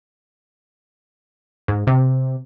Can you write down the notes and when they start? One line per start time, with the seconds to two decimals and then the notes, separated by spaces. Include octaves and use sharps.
1.68 G#2
1.87 C3